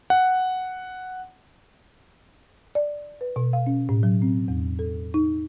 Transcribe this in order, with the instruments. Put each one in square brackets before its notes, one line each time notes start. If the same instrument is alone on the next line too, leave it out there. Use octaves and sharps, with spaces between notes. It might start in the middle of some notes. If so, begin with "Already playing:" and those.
[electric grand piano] F#5
[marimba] D5
B4
B2
F5
C#4
A2
F#3
C4
E2
A4
D#4